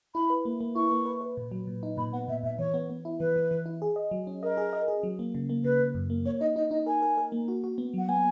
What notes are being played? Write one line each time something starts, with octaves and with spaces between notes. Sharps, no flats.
E4 B5
B4
A#3
A#3
E4 C#6
A#3
B4
B4
A#2
F#3
A#2
D#4
A#2 B5
B3 F#5
A#2 E5
A#2 E5
E3 C#5
B3
B3
E4
E3 B4
E3
E3
E4
G#4
D#5
F#3
C#4
A#4 D#5
G#4
D#5
G#4
F#3
A#3
C#3
A#3
C#3 B4
C#3
F#2
A#3
A#3 C#5
D#4 D#5
D#4 D#5
D#4 D#5
A#4 G#5
A#4
A#4
A#3
F#4
F#4
B3
F#3 F#5
B3 G#5